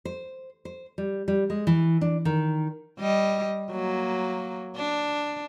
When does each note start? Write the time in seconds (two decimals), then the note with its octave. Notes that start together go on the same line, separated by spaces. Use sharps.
0.05 C5
0.65 C5
0.98 G3
1.28 G3
1.50 G#3
1.67 E3
2.01 D4
2.25 D#3
2.99 G3 D#5
3.71 F#3 A#3
4.76 D4